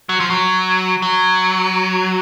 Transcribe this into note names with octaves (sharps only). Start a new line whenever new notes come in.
F#3
F3
F#3
F#3